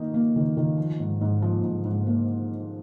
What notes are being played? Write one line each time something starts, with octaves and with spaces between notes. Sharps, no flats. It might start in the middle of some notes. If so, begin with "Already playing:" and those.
Already playing: D#3 A#3 D#4
A#3
D#3
D#3
F3
G#2
G#2
F3
G#2
G#2
A#3